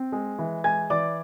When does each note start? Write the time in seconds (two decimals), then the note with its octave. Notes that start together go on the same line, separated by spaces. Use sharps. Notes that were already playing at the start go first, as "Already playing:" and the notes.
Already playing: C4
0.12 G#3
0.39 E3
0.64 G#3 G#5 G#6
0.90 E3 D5 D6